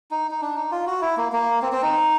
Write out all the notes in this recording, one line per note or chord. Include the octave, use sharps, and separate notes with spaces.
D#4
D#4
D4
D#4
F4
F#4
E4
A#3
A#3
C4
C4
D#4